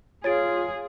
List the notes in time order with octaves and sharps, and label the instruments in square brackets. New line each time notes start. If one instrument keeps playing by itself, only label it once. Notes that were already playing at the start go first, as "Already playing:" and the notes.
[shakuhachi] F4 [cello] G#4 [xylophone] C#5 A6 D7